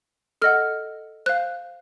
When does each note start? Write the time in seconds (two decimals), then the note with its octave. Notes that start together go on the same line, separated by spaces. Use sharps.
0.42 A4 D#5 F#5 F6
1.26 C5 F5 F#6